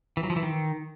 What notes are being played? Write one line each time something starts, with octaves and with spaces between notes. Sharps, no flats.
E3
F#3
F3
E3
D#3